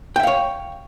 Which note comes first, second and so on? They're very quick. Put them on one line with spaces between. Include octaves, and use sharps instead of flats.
G5 E5 F5 C#5